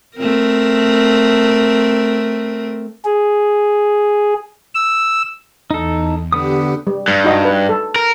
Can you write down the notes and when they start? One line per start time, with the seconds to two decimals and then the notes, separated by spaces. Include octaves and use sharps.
0.17 A3 C4 A#4
3.05 G#4
4.75 E6
5.71 E2 D#4 A4
6.32 D3 B3 G4 D#6
6.87 G3
7.08 G2
7.24 D#4 F#4 D#5
7.45 B4
7.69 A4
7.96 A#4